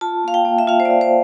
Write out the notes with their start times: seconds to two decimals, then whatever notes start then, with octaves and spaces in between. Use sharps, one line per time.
0.01 F4 A5
0.24 A#3 F5
0.34 G5
0.45 A#3
0.59 E5
0.67 F4 F5
0.80 C5
0.85 F4 D5
1.01 C5